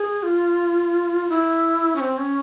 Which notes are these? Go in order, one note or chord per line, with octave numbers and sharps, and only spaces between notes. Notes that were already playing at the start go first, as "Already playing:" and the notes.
Already playing: G#4
F4
E4
C#4
C4
C#4